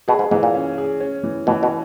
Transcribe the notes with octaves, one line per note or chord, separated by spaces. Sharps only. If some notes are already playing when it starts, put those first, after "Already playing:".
B2 G#4
G#2
G#2 E3
A#2
C#4
G#4
C#4
E3
B2 E3
B2